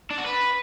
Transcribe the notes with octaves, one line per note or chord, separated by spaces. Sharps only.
D4
F#4
B4